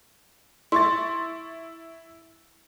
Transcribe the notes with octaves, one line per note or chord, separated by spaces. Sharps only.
E4 C6 C#6 A6